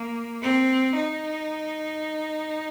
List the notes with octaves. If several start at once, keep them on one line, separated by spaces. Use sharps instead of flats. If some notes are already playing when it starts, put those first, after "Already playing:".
Already playing: A#3
C4
D#4